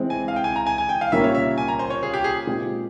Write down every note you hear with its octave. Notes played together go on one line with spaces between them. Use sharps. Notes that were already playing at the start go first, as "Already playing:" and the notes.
Already playing: E3 G#3 C4
G#5
F5
G5
G#5
A#5
G#5
G#5
G5
F5
A#2 G3 A#3 C#4 F4 E5
C#5
E5
G#5
A#5
C5
C#5
G#4
G4
G#4
A#2 G#3 C4 G4